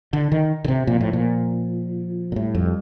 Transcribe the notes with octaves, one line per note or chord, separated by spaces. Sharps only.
D3
D#3
D3
C3
A#2 F3
A2
A#2
A#2
A2 G3
F2